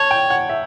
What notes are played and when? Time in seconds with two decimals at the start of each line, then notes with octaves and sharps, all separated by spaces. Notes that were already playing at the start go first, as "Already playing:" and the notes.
Already playing: C#5 A5
0.11 G5
0.30 F#5
0.49 E5